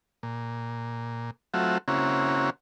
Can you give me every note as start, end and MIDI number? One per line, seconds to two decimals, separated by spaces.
0.23 1.31 46
1.54 1.78 54
1.54 1.78 57
1.54 1.78 60
1.54 1.78 65
1.54 1.78 66
1.54 1.78 76
1.88 2.50 49
1.88 2.50 58
1.88 2.50 60
1.88 2.50 61
1.88 2.50 64
1.88 2.50 66